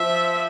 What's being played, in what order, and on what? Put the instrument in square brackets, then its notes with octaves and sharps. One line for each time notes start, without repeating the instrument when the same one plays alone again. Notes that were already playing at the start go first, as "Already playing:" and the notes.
Already playing: [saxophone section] F3 [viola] E5